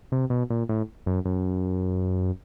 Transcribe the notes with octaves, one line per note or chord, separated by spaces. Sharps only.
C3
B2
A#2
A2
F#2
F#2